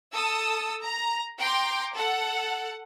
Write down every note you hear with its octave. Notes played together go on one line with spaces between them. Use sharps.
A4 A5 D#6 E6
A#5
G5 A#5 C6 D6
A4 F#5